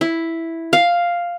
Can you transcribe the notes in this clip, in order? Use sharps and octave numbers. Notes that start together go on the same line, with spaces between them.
E4
F5